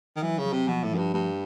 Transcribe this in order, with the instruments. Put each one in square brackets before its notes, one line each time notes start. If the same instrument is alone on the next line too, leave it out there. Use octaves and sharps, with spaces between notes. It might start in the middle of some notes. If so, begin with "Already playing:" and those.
[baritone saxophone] D#3
[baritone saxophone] E3 [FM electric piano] F#3
[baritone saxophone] C#3
[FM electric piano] F#3
[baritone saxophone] C3
[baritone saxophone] B2 [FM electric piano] F3
[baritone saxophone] A2
[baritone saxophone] F#2 [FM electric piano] F3
[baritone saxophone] G2
[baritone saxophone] G2 [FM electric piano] A3